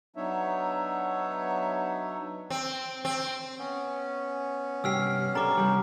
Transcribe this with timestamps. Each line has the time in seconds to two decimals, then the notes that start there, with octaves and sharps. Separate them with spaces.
0.16 F#3 B3 D4 D#4 C#5 E5
2.50 C4
3.05 C4
3.58 B3 C#4
4.84 C2 G2 G4 E6 F6 C7
5.35 B1 D4 A4 A#5 D6
5.57 C2 G3